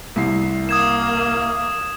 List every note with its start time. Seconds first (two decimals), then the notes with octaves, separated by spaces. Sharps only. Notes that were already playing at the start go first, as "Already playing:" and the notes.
0.16 C2 C7
0.69 A#3 D#6 G#6 E7